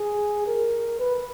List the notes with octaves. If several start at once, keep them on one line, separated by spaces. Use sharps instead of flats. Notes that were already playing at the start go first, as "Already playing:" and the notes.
Already playing: G#4
A#4
B4